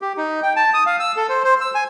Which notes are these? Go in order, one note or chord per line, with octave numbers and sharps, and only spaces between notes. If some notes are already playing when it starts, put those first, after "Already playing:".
G4
D#4
G5
A5
D#6
F5
E6
A4
C5
C5
E6
G#5